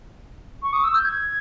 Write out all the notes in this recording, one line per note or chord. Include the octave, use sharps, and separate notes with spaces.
C#6
D#6
E6
G6
G#6